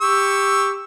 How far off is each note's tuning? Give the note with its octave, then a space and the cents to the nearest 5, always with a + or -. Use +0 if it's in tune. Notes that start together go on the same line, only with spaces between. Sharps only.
G4 +15 C#6 +0 E6 +0